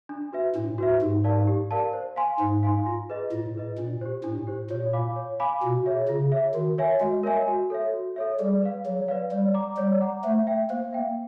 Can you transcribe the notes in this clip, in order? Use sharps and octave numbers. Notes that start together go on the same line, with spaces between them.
D4
F#4 B4 E5
A2 D4
F#4 B4 E5
G#2 G4
A#4 D5 F5 A5
G4
A#4 D5 F5 A5
C5
F5 G#5 C6
G#2 C5
F5 G#5 C6
F4
G#4 B4 D#5
A2 F4
G#4 B4 D#5
A#2 D4
G4 C5
A2 D4
G4 C5
A#2 C#5
F5 G#5 B5 D6
C#5
F5 G#5 B5 D6
B2 F4
G#4 C#5 E5
C#3 F4
G#4 C#5 E5
D#3 F#4
A#4 C#5 E5 G#5
G#3 F#4
A#4 C#5 E5 G#5
F#4
A4 C#5 E5
F#4
A4 C#5 E5
G3 G#4
B4 D5 F5
F#3 G#4
B4 D5 F5
G3 C#5
F#5 A#5 D6
G3 C#5
F#5 A#5 D6
A3 C5
E5 G5
A#3 C5
E5 G5